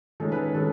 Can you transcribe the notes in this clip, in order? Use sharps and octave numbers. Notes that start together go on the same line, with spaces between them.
D#3 G#3 C#4 A4
B4
D#3 G#3 C#4 A4